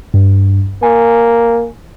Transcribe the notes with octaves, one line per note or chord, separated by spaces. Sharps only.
G2
A#3 G#5